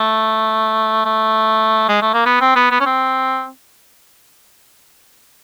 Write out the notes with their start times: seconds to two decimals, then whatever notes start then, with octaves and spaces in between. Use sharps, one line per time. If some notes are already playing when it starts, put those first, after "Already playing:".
Already playing: A3
1.05 A3
1.89 G#3
2.02 A3
2.13 A#3
2.26 B3
2.41 C4
2.56 B3
2.71 B3
2.80 C#4
2.86 C4